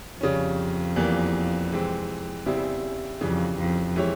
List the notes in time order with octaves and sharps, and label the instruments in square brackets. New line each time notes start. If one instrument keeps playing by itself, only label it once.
[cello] F2 [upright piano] C#3 G3 C#4
[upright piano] E2 E3 G3 A#3
C3 E3 G#3 C4
E2 C#3 G3 C4 E4
[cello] F2 [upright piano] C#3 E3 G3
[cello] F2
[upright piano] E3 G#3 E4 G4 C#5